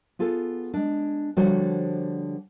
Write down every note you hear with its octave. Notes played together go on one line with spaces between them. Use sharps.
B3 F4 G#4 A4
G#3 D4
D3 F3 G3 F#4 C5 C#5